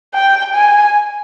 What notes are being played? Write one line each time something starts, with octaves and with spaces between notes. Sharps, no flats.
G5
G#5